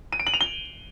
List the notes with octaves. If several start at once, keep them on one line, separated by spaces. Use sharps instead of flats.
D#7
D7
F#7
F7
G7